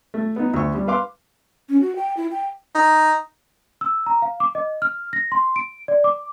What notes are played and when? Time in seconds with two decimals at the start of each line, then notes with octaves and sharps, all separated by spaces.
0.14 A3
0.36 B3 D#4
0.54 D2 C#6
0.75 G3
0.88 B4 F5 C6 D6
1.69 C#4
1.81 F#4
1.96 G5
2.17 E4
2.31 G5
2.75 D#4
3.81 E6
4.06 A#5
4.22 F5
4.40 D6
4.55 D#5
4.82 F6
5.13 A#6
5.32 C6
5.56 D7
5.88 D5
6.04 D6